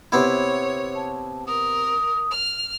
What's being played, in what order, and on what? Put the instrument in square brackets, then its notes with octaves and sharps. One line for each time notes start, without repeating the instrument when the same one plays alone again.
[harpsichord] C3 B3 E4 [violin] C#5
[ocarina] A5
[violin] A#4 [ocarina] D#6
[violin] F6